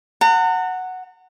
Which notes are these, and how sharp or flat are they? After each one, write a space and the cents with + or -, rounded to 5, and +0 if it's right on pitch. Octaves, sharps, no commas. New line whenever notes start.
F#5 +0 A#5 -45